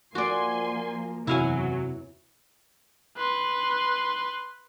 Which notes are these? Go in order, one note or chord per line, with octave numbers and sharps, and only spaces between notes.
F3 A#3 F#4 D5 G#5 C6
F#1 E2 C3 F#3 E4 F5 G#5
B4 C6